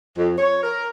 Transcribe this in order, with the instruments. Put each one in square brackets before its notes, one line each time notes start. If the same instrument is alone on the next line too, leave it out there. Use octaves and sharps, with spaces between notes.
[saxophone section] F2
C#5
A#4